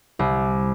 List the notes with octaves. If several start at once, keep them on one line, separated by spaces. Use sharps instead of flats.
C2